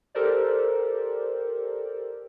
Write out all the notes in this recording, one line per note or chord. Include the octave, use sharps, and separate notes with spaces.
G4 A4 A#4 C5 D5